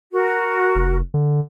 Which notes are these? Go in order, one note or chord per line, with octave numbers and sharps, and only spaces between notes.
F#4 A#4
F1
D3